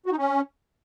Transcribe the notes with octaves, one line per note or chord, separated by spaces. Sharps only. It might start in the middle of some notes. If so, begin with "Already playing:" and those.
F#4
D#4
C#4